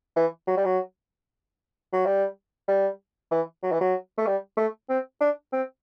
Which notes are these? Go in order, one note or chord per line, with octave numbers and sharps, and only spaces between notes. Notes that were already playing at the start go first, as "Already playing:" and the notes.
E3
F#3
G3
F#3
F#3
G3
G3
E3
F#3
E3
F#3
A3
G3
A3
C4
D4
C4